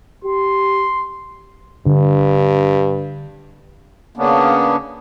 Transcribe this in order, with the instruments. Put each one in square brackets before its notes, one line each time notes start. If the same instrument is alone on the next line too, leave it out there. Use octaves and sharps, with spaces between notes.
[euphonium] G4 [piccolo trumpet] C6
[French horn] G2 [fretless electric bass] D3
[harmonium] C#3 A#3 B3 C#4 D4